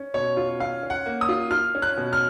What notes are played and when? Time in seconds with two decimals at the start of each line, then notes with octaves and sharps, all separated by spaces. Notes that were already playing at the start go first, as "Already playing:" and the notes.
Already playing: C#4
0.14 B2 C#5
0.37 F4
0.60 C#4 F5
0.83 C#4
0.90 F#5
1.06 A#3
1.21 D#6
1.29 F4
1.51 F4 F6
1.75 C#4
1.82 F#6
1.97 B2
2.13 F6